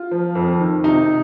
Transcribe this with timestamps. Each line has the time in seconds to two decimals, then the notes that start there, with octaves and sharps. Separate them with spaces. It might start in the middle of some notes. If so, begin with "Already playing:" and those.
Already playing: F4
0.11 F3
0.35 F2
0.60 D#3
0.84 C3 D#4